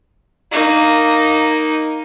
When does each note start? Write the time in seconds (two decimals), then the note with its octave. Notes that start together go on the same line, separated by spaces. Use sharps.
0.51 A#3 D#4